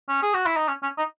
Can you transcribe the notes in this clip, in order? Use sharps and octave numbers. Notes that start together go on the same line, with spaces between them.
C#4
G#4
F#4
E4
D#4
C#4
C#4
D#4